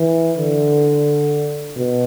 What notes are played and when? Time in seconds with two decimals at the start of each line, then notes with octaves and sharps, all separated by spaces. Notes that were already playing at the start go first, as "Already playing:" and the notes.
Already playing: E3
0.37 D3
1.76 B2